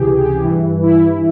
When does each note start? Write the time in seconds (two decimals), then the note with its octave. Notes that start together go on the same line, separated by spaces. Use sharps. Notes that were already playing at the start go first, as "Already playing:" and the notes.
Already playing: C#2 C3 E3 G4 G#4
0.18 G4
0.43 G2 E3
0.83 E4